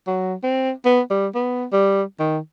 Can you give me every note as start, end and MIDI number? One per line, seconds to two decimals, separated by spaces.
0.07 0.34 54
0.43 0.71 60
0.85 1.01 59
1.10 1.27 55
1.35 1.66 59
1.72 2.02 55
2.19 2.38 51